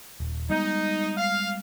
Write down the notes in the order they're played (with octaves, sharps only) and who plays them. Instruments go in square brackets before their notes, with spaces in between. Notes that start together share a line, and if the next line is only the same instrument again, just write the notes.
[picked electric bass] D#1
[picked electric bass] G3 G#3 B3 [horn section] D#4
[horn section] F5